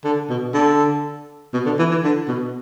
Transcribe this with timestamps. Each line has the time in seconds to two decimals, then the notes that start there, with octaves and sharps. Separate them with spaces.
0.04 D3
0.29 B2
0.54 D3
1.54 B2
1.66 D3
1.79 E3
1.91 E3
2.03 D3
2.28 B2